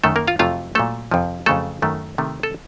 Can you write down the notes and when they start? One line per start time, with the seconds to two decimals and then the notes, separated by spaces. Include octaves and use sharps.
0.04 F#2 D#3 A3 A4
0.16 A#3 A#4
0.28 F4 F5
0.39 F2 C3 F#3 A3 F4 F5
0.75 A#2 F#3 A3 A4
1.11 F2 C3 F3
1.46 F2 C#3 F#3 A3 A4
1.82 F#2 D#3 F#3 A3
2.18 C3 D#3 A3
2.43 A4